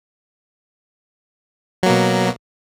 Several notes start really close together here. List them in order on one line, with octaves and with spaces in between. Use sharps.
F#3 A#3 B2